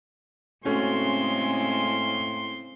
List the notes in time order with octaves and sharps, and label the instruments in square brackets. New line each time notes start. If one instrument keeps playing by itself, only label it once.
[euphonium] A2 [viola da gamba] C#3 G#3 C4 [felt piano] A3 C#4 F#4 [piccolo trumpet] C6